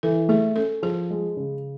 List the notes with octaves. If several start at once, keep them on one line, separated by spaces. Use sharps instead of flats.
E3 A4
A3 G#4
C#4 A4
F3 G#4
G#3
C#3